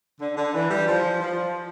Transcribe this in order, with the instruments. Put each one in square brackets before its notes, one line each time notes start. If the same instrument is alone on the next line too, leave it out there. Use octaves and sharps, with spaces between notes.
[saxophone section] D3
D3
E3
G3
F3
F3